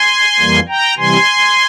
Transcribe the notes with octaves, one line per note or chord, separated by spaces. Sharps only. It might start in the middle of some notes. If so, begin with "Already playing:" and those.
Already playing: G#5 C6
F2 E3 G3 A#3
G5 A#5
C3 E3 G3 G#5 C6